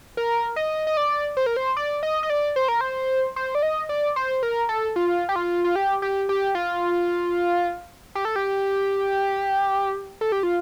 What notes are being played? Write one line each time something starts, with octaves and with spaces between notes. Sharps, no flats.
A#4
D#5
D#5
D5
C5
A#4
C5
D5
D#5
D#5
D5
C5
A#4
C5
C5
D5
D#5
D5
C5
A#4
A4
F4
G4
F4
F4
G4
G4
G4
F4
G4
A4
G4
A4
G4
F4